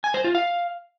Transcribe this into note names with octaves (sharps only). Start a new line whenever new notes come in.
G#5
C5
F4
F5